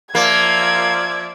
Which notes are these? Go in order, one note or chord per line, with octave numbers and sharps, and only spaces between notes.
F3 A#3 D5 E5 G#6